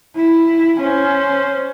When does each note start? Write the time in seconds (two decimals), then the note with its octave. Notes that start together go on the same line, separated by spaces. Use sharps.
0.16 E4
0.80 C#4 C5